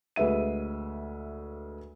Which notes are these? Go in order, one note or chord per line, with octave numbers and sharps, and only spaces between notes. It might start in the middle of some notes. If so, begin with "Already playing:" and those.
D2 G#3 B4 E5 D#7